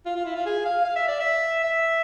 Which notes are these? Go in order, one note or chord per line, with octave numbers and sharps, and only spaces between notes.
F4
F4
E4
F4
G#4
F5
F5
E5
D5
E5
E5